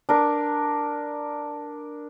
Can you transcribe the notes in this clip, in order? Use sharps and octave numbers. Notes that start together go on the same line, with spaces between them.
D4 A#4